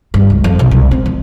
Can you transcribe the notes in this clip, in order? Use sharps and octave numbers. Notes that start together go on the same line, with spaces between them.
G2
C#2
F2
B1
C2
C4
F3